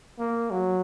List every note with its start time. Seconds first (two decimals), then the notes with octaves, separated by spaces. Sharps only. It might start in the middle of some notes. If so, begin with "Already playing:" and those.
0.19 A#3
0.51 F#3